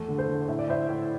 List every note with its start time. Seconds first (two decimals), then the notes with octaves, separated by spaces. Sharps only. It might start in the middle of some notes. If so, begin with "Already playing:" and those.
Already playing: E2 A3
0.08 D3
0.18 A4 C5
0.28 D3
0.48 A2 E5
0.59 D5
0.68 A2 C5 E5
0.89 A2